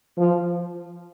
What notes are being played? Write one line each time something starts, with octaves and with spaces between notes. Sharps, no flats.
F3